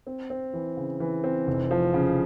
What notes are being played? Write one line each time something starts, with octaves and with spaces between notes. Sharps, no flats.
C4
C4
E3
C#3
E3
C4
F1
F3
C#3